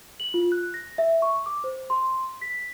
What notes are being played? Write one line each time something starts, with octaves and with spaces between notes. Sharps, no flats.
F#7
F4
F#6
A#6
E5
C#6
D6
C5
C6
B6